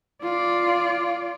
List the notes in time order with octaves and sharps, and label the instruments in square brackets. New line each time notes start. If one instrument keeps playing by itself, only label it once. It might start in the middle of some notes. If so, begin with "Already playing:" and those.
[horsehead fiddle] F4 D5